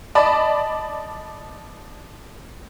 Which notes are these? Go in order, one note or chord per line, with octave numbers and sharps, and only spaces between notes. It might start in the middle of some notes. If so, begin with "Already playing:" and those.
D5 D#5 A5 B5